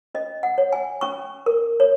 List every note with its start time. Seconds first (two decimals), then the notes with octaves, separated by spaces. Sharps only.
0.14 C#4 D#5
0.43 F#5
0.58 C#5
0.73 G#5
1.01 C#4 C#6
1.46 A#4
1.80 C#5